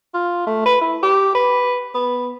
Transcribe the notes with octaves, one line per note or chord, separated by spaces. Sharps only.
F4
A3
B4
E4
G4
B4
B3